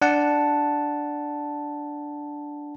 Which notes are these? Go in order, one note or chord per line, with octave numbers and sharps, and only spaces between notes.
D4 F#5 A5